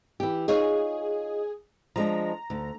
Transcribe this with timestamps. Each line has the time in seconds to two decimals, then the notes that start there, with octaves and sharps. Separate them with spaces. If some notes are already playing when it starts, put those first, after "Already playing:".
0.20 E3 G4
0.48 D#4 F4 G#4 C#5
1.96 F3 G#3 D4 A#5
2.50 D2